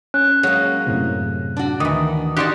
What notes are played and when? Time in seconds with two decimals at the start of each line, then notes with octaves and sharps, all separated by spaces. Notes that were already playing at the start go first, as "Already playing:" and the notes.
0.14 C#4 F#6
0.43 F#3 G#3 A#3
0.87 F#2 A2 C3
1.57 D4 F#4
1.80 D2 D#3 E3 D6 D#6
2.37 D#4 F#4 G4 D5 D#5 A5 C6 F#6